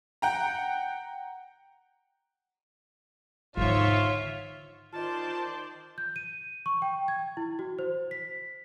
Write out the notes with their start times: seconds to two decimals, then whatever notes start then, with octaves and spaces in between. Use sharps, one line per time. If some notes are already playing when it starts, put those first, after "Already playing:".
0.22 F#5 G5 A#5
3.57 G#2 D3 D#3 F4 C#5 E5
4.93 D#3 F4 C5 D5 D#5 A5
5.98 G6
6.16 D#7
6.66 C#6
6.82 G5
7.08 G#6
7.37 E4
7.59 F#4
7.79 C5
8.11 B6